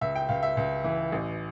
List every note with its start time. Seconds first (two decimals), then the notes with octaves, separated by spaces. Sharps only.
0.01 C#2 E5
0.16 G5
0.29 C#2 F5
0.43 E5
0.57 C#2
0.84 E3
1.12 A1